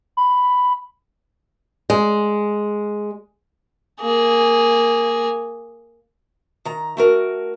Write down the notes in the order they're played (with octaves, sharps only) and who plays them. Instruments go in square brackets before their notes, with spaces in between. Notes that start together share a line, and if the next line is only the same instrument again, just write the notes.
[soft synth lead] B5
[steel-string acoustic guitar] G#3
[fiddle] A#3 G#4
[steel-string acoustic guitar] D#3 A#5
A3 F#4 A#4